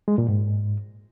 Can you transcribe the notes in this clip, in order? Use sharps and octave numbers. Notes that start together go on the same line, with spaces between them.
G#3
A#2
G#2